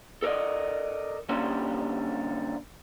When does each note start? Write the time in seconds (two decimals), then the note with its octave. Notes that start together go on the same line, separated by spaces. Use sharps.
0.22 A4 A#4 D5 D#5
1.29 D3 G3 A#3 C#4 G4 C5